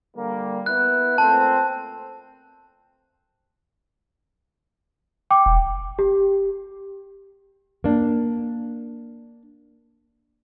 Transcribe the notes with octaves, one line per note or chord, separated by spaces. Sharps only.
D3 G3 A#3
B3 E4 F#6
A#2 A3 C4 A5
G5 D6
E1
G4
A#3 D4